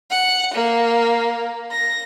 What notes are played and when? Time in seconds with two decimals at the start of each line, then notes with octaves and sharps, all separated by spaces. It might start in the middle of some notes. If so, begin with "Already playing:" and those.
0.11 F#5
0.54 A#3
1.72 A#6